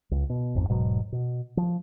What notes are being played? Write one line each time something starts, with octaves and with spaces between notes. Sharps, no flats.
C#2
B2
A1 F2 G#2
E1 G#2 B2 F#3
B2
F3